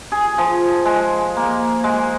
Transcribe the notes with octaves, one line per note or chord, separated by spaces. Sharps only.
G#4
F3
G#3
A#3
G#3